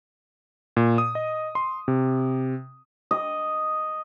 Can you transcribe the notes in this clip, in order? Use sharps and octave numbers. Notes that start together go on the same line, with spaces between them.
A#2
D#6
D#5
C6
C3
D#5